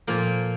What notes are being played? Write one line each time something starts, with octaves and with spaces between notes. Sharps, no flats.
A#2 F3 A#3